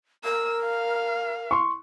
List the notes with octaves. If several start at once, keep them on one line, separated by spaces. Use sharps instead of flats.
A#4 E6
F5
C6 C#6